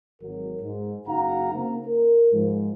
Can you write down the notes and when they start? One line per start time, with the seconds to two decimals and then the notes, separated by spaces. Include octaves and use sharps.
0.22 G#1 F#3 A#4
0.62 G#2
1.07 F#1 D#4 F#4 F5 F#5 A#5
1.53 C#3 A#3 C4
1.86 A#4
2.33 G#2 F3